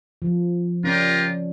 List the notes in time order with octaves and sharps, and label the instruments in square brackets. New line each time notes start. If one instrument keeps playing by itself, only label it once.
[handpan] F3
[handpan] C#4 D4 [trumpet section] F4 G4 A#4